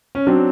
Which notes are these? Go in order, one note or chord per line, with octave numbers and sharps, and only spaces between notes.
C#4
F#3 C4 D4